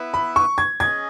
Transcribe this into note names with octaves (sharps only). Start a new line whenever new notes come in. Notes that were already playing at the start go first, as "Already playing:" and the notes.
Already playing: B3 E4 B4 E5
B5
C#6
G#6
C#4 G#4 D#5 G#6